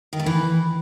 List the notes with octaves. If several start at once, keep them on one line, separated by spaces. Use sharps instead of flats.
D#3
A3
E3